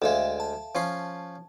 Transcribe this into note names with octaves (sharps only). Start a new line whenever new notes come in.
D2 G#3 A4 E5 F5
A5
F3 C#4 C6